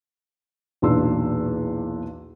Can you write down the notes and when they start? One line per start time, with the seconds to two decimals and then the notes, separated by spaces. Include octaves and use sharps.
0.82 B1 E2 A#2 D4 C6 E6